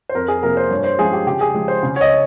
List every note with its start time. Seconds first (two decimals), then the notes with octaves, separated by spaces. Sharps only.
0.09 C5
0.14 F2 A#4
0.28 G#4
0.42 C3 F3 A#3 A#4
0.57 C5
0.70 G2 C#5
0.84 C5
0.98 F3 G#3 C#4 G#4
1.13 G4
1.27 C#3 G4
1.41 G#4
1.54 F3 G#3
1.68 C5
1.83 C#3
1.96 C#5
2.01 D#5